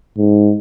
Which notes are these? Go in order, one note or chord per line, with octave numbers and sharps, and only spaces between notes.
G#2